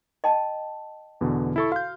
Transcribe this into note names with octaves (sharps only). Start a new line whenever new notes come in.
D#5 G5 A5
E2 B2 D3
E4 A4 C#6
F#4 F5 G6